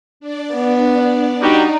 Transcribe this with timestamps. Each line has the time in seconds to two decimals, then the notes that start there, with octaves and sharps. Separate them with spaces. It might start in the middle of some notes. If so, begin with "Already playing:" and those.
0.20 D4 D5
0.55 B3
1.42 G3 D#4 F#4 G4